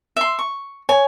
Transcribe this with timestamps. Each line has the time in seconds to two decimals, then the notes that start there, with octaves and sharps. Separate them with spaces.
0.16 E5 C6
0.39 C#6
0.89 C#5 G#5